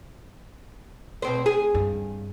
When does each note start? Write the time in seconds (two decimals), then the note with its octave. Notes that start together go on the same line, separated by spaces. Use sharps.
1.22 B2 C4 C5
1.46 G#4
1.75 G2